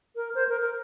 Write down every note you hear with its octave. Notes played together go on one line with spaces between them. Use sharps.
A#4
C5
A#4
A#4